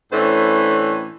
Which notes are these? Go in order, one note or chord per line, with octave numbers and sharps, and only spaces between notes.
A2 E3 A3 C#4 D4 C5